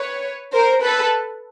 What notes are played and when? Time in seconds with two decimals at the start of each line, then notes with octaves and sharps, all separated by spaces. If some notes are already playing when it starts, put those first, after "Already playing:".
Already playing: B4 C#5
0.53 A#4 C5
0.82 A4 B4